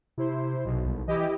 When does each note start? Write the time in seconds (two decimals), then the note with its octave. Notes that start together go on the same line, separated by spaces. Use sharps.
0.18 C3 E4 C5
0.65 B1 B2
0.86 C2
1.08 E3 E4 G4 D#5